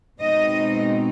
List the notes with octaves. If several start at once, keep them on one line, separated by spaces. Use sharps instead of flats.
B2 G#3 C4 D#4 D#5